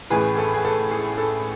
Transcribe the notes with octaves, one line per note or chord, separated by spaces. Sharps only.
A1 A2 E3 G#4 B4
A4
G#4
A4
G#4
A4